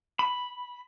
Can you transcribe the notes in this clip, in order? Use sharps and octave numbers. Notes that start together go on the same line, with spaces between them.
B5